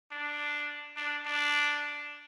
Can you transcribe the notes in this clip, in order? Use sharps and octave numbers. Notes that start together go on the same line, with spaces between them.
D4
D4
D4